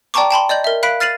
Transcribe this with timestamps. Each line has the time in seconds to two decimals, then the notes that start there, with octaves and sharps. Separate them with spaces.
0.14 D5 G5 A5 A#5 C#6 D6
0.31 G5 A5 B5 C6
0.49 D5 D#5 G6 F#7
0.64 A#4 E5
0.83 F5 B5 F#6 B6 D7
1.00 F6 A6 C7 D#7 F7 F#7